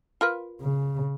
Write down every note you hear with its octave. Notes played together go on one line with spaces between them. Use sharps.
F4 A#4 B4
C#3